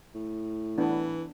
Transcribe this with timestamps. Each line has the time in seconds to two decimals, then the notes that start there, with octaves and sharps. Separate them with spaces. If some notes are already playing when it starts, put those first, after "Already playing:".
0.15 A2
0.78 E3 B3 D4